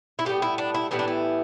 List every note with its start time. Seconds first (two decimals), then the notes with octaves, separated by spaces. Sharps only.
0.19 E4
0.25 A2 E3 G3 B3 G4
0.42 E4
0.58 D4
0.74 E4
0.91 A2 E3 G3 B3 E4
0.99 D4
1.08 E4